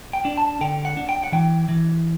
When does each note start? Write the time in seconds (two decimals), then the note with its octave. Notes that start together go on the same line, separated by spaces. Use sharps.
0.13 G5
0.25 D4
0.38 A5
0.61 D3 G5
0.85 F#5
0.97 D4
1.09 G5
1.24 F#5
1.32 E3 G5
1.69 E3